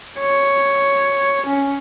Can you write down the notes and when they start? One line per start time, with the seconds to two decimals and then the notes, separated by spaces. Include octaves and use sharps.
0.19 C#5
1.46 C#4